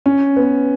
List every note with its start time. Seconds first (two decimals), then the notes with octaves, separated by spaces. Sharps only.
0.06 C#4
0.37 B3